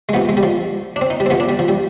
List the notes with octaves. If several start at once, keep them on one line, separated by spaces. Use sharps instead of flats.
G#3
C3 F3 B3
G#3
G3
F3
D4
C4
D#4
G3
C4
C3 F3 B3
D4
G3
F3
G3